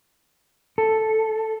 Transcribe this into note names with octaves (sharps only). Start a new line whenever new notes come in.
A4